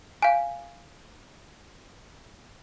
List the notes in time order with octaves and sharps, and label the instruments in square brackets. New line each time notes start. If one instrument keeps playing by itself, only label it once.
[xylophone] F5 G#5